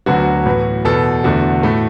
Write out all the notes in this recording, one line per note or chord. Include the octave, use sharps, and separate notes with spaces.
D2 D3 F#3 B3 F#4
A2 E3 B3
E2 B2 B3 A4
E2 D3 A3 F#4
A2 A3